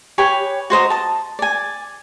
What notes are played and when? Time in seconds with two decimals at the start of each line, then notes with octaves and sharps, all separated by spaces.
0.18 G4 B4 C#5 G#5
0.70 F#4 C5 D#5 A#5
0.90 A5 D#6
1.39 D5 G#5